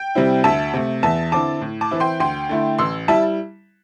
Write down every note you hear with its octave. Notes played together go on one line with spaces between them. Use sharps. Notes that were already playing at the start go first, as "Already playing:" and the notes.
Already playing: G5
C3 G3 C4 E4
D2 E5 A5
C3 A3
E2 E5 A5
D3 C4 E4 A5 D6
A2
A5 D6
E3 C4 E4
G5 C6
D2 G5 C6
D3 A3 E4
A1 C6 E6
G3 E4 E5 A5